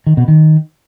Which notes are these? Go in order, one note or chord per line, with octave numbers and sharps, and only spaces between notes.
D#3
B2
D#3